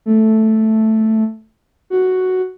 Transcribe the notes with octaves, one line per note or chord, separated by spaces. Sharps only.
A3
F#4